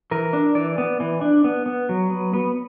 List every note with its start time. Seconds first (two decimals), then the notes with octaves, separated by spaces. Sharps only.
0.11 E3 A#4
0.33 D4
0.55 E3 D5
0.78 B3
1.00 E3
1.21 D4
1.44 B3
1.66 B3
1.89 F#3
2.10 B3
2.33 B3